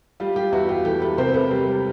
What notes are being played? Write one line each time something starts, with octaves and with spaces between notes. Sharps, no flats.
G3 F4 G4
F4 G4
E2 E4 F#4
F4 G4
E3 G4 A4
A4 B4
C3 A#4 C5
A4 B4
G3